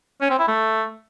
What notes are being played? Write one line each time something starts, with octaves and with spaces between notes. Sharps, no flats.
C#4
C4
E4
A3